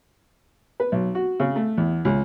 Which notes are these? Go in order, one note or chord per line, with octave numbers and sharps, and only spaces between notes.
B4
B1
F#4
C#3
A3
E2
C#2